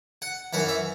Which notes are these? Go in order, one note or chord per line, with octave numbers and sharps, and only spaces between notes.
F#5
F#2 E3 F#5
E5